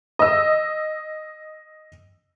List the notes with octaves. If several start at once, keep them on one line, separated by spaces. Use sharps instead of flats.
D#5 E6